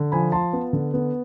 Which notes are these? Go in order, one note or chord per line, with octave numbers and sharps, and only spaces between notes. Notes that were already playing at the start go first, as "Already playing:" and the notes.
Already playing: D3
F3 G#5 B5
F4 A5 C6
B3
D3
B3